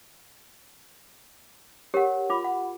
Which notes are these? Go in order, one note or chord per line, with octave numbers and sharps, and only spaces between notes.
G4 A#4 C#5 F#5
F4 B5 D6
F#5